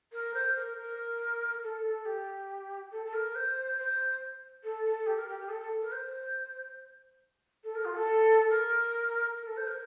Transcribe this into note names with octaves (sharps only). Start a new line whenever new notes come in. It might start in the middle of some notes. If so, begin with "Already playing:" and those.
A#4
C5
A#4
A#4
A4
A4
G4
A4
A4
A#4
C5
C5
A4
A4
G4
A#4
G4
G4
A4
A4
A#4
C5
A4
A#4
F4
A4
A#4
A#4
A4
C5
A#4